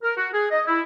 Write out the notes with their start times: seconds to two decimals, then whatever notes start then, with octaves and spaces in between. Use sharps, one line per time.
0.03 A#4
0.17 F#4
0.33 G#4
0.51 D#5
0.67 E4